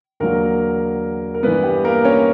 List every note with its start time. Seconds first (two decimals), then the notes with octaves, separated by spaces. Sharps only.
0.20 E2 D3 F#3 A#3 A#4
1.34 A#4
1.43 G2 E3 B3 B4
1.63 G4
1.84 A#3 A#4
2.05 C#4 C#5